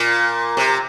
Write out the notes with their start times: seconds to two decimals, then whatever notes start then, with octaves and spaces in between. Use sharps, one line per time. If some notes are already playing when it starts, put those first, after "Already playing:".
Already playing: A#2
0.57 C3